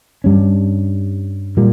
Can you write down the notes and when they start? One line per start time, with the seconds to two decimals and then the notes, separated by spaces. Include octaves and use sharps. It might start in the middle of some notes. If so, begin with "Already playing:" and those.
0.24 G2 G3 C#4
1.57 A#2 G3 A#3